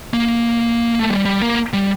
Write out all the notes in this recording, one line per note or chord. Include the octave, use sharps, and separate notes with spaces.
A#3
A3
G3
G3
A#3
G3